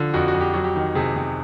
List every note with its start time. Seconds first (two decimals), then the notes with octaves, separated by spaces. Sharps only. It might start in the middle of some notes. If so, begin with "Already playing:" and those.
Already playing: D3 F3
0.14 F2 F#4
0.28 F#4
0.34 F2
0.41 G4
0.53 F#3 F#4
0.64 G4
0.76 D#3
0.95 C3 G#4
1.16 C3